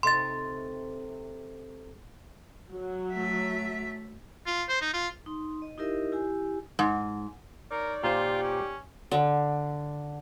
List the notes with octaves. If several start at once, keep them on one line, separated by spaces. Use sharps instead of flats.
C3 A3 D#4 C6 A6
F#3
A3 E5
F4
C5
D#4
F4
D#4 C6
D#5
D#4 E4 G4 A#4 D#5 E5
E4 G4 G#5
G#2
D#4 A#4 C#5 D5
A#2 F4 G4 C5
C#4
D3